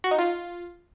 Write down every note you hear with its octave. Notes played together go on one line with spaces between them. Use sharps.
F#4
D#4
F4